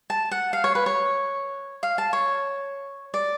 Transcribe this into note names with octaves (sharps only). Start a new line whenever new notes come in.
A5
F#5
F5
C#5
B4
C#5
F5
A5
C#5
D5